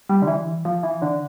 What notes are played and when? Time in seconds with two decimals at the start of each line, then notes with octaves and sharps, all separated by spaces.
0.09 G3
0.22 D3
0.27 E3
0.65 F3
0.83 E3
1.02 D3